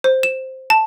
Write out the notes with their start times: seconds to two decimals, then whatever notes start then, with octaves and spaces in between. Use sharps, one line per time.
0.04 C5
0.23 E7
0.70 A5